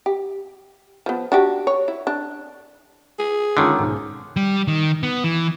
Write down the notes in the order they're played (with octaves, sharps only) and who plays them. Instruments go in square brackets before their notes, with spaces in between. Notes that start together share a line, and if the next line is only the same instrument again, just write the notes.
[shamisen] G4
F3 B3
D4 F#4 G4
C#5
E4
D4
[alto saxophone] G#4
[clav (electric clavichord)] D3 D#3 [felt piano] G#3 C#4 F4
[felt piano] B1 G#2
[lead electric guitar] G3
D#3
B3
E3